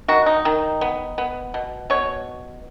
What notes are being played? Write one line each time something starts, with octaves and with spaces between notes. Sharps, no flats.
D#3 F#4
D#4
D#3
B3
B3
B2
B2 C#5